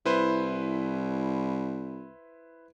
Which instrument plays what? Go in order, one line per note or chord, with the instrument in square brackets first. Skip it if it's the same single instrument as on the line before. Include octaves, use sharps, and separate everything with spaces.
[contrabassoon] C2 [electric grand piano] E4 B4 C5